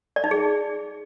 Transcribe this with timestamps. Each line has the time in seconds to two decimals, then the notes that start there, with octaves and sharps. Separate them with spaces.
0.16 D5
0.24 D#4
0.31 G#4